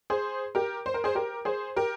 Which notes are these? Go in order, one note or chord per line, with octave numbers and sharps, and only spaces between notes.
G#4 C5
G4 A#4
C5
A#4
G#4 C5
G4 A#4
G#4 C5
G4 A#4